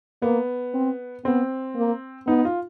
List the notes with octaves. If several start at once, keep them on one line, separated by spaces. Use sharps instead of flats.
A#3 B3
C4
B3 C4
A#3
B3 D#4
F4